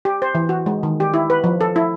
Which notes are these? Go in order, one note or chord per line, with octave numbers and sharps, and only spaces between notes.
G4
C5
E3
F#4
G#3
D#3
G4
E4
B4
F3
A4
E4